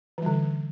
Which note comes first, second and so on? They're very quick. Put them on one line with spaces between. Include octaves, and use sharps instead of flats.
E3 G3 D3